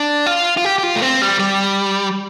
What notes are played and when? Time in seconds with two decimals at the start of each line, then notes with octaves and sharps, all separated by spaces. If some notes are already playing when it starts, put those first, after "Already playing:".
Already playing: D4
0.26 F4
0.57 F4
0.65 G4
0.78 G4
0.83 F4
0.96 A3
1.02 C4
1.22 G3
1.40 G3